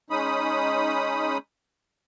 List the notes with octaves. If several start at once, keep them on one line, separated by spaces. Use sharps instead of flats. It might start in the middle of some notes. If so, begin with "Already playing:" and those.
G#3 C#4 D#4 B5 D#6